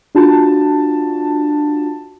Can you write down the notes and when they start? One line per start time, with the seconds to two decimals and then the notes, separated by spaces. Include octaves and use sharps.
0.15 D4 F4 F#4 A5